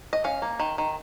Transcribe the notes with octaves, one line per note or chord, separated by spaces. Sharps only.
D#5
C#4 F5
A#3
D#3
D#3